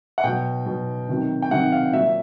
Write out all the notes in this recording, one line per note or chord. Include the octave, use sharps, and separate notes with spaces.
F#5
B2 F#3 G5
B2 F#3
C3 D#3 F#3
G5
C3 D#3 F#3 F#5
F5
A#2 F#3 E5